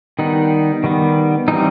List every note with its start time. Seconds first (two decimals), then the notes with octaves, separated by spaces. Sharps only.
0.19 D#3 G3 B3 D#4
0.84 D#3 G3 B3
1.48 E3 G3 C4 D#4